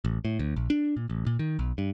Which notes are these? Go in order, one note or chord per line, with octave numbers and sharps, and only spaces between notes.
A1
A2
D2
A#1
D4
A#2
A1
A#2
D#3
B1
G2